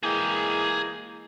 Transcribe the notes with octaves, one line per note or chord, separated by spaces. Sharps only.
E3 G#3 A#3 G#4 G5